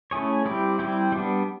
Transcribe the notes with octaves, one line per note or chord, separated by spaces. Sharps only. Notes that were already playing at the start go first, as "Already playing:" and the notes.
A3 C#4 E4 G#4 C#5
G3 C4 E4 G4
G3 C4 E4 G4
G3 B3 D4